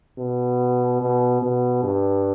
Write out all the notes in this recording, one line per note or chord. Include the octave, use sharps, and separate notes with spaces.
B2
B2
B2
G2